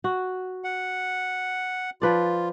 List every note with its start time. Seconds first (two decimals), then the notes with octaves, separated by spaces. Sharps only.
0.04 F#4
0.64 F#5
2.02 F3 F4 B4 D5